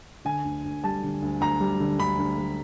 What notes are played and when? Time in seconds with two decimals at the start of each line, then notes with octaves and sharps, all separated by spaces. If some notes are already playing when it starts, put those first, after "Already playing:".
0.25 D3 G#5
0.44 D2
0.64 D2
0.84 G3 A5
1.03 D3
1.22 D2
1.40 D2 A#5
1.60 G3
1.80 D3
1.99 D2 B5
2.19 D2
2.38 G3